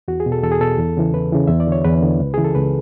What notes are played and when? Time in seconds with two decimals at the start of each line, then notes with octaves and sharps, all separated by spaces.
0.08 E2 F#4
0.20 G#4
0.26 B2
0.32 A4
0.43 E2 A4
0.52 G#4
0.61 B2 A4
0.79 E2
0.97 C#3 E3
1.14 E2 B4
1.32 C#3 E3
1.47 E2 E5
1.60 D5
1.67 D3 C#5
1.85 E2 B4
2.02 D3
2.20 C#2
2.34 C#3 E3 G#4
2.45 A4
2.55 C#2 B4